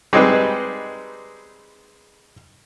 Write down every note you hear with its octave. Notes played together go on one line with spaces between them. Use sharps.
G3 G#3 C4 D#4 B4